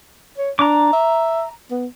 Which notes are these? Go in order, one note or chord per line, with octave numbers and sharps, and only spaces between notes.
C#5
D4 A#5 D6
E5
B3